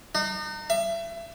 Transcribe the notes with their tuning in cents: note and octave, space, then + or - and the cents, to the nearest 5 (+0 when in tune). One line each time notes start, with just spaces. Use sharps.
D#4 -40
E5 +30